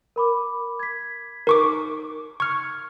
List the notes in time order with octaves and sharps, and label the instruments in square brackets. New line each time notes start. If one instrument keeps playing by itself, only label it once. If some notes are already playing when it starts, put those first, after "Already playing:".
[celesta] A#4 B5 D6
G#6 B6
[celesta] D#4 [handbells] A#4 C#6 D6
[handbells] C#6 F6 [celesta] G#6 C#7